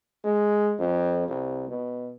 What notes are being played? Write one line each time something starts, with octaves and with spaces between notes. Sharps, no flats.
G#3
F2
C2
B2